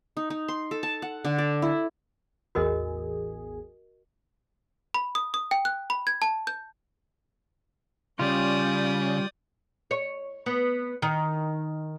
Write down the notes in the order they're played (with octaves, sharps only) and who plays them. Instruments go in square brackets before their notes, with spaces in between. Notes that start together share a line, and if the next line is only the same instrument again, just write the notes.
[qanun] D#4
D#4
C6
A4
A5
F#5
D3
D5
E4
[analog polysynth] A1 E2 G#4 [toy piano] F#4 A#4 D#5
[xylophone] B5
D#6
D#6
G5
F#6
B5
G#6
A5
G6
[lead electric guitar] C#3 [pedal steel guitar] G3 F4 [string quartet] D5 D#6 G6
[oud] C#5
B3
D#3